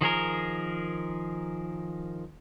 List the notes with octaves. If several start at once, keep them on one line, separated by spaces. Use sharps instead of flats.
D#3 F3 G#4 A#4